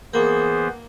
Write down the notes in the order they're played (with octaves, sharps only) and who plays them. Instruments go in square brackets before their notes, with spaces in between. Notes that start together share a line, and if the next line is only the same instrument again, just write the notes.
[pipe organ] E3 B3 C5 [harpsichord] A#3 [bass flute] G#4